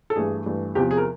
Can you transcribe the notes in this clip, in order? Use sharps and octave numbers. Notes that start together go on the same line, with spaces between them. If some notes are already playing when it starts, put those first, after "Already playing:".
A4
G2 E3 A3 G#4
G2 E3 A3
E2 C3 F3 G4
G#4
A#4